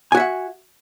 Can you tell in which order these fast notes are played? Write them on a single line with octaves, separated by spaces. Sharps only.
G#5 F#4 E5 F#5